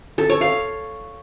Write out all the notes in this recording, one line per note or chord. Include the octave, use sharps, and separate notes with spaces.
A4
C#5
F5